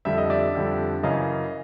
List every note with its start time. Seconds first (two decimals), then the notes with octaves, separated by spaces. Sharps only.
0.05 F2 D3 G3 E5
0.18 D#5
0.30 D5 E5
0.55 F2 D3 G3
1.03 F#2 C#3 E3 D#5 F5